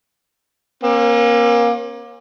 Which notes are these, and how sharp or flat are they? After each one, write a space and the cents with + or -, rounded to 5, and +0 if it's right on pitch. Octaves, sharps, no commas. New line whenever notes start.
A#3 +25 C#4 -45